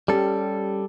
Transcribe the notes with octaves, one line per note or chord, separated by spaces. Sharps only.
G3 C#4 G4 A4